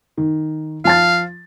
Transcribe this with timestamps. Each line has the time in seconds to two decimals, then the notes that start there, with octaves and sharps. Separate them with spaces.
0.17 D#3
0.85 F3 F5 A5 A6